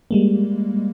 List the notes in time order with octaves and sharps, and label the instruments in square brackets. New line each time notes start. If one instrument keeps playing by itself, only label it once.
[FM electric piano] G3 G#3 A#3